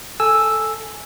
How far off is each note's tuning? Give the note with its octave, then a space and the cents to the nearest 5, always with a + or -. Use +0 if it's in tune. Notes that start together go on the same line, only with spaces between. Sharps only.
A4 +0 G#5 +0 E6 +0